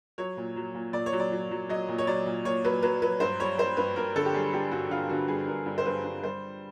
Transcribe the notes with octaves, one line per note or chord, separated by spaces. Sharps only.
F#3 C#5
A#2
F#3
A#2
A#2 D5
C#5
F#3
D5
F#3
F#3
F#3 D#5
A#2
C#5
F#3 D5
A#2
A#2 C#5
F#3 B4
F#3 B4
F#3 B4
G2 C5
G3 C#5
G3 C5
G2 B4
G2 A#4
D3 A4
G4
G3 G#4
G3 G4
G2 F#4
D3 F4
D3 F#4
G2 G#4
G2 A#4
G2
C5
G2 B4
G2
G3 C5